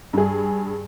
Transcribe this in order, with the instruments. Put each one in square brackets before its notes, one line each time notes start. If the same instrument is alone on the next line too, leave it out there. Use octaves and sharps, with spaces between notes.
[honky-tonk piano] G2 G#4